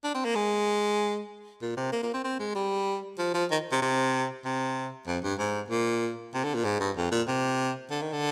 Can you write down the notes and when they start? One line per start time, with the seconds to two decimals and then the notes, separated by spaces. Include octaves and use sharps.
0.04 D4
0.15 C4
0.25 A#3
0.35 G#3
1.62 A#2
1.77 C3
1.92 A#3
2.03 A#3
2.14 C4
2.24 C4
2.40 G#3
2.55 G3
3.18 F3
3.34 F3
3.51 D#3
3.72 C3
3.82 C3
4.45 C3
5.07 F2
5.23 G2
5.39 G#2
5.70 A#2
6.34 C3
6.44 D3
6.55 A#2
6.64 G#2
6.80 G2
6.97 F2
7.12 A#2
7.28 C3
7.91 D3
8.02 D#3
8.13 D3